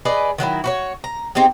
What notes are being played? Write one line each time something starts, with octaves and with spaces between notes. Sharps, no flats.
G#4 B4 D5 D#5
D#3 F#3 A3 E4
F#4 B4 C#5
A#5
C4 D#4 G4 G#4